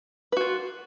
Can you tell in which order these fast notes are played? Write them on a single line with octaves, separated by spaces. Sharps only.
B4 F#4 F4